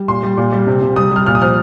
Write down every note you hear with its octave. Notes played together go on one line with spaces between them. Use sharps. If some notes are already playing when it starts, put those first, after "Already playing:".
Already playing: G3
A#2 C6
G3
A#2
G3
C3
C3
G3 D#6
G3 F6
A#2 F6
D#6
F3 F6